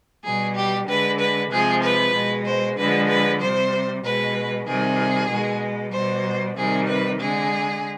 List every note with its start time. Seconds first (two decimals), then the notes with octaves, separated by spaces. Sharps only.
0.24 B2 G3 G#4
0.55 G4
0.87 D3 G#3 B4
1.19 B4
1.50 C3 F3 G#3 G#4
1.82 B4
2.14 B2 G#3
2.46 C5
2.77 D3 F3 G#3 B4
3.09 B4
3.41 C3 G3 C5
4.03 B2 G#3 B4
4.66 C3 D#3 G3 G#4
5.29 B2 G#3
5.92 B2 G3 C5
6.57 C3 D#3 G3 G#4
6.87 B4
7.20 D3 G#3 G#4